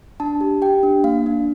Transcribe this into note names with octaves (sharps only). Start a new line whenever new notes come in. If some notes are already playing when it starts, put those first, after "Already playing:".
D4 A5
G4
G4 G5
D4
A#3 F5
D4